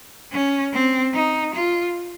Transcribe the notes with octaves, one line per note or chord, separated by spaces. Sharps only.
C#4
C4
D#4
F4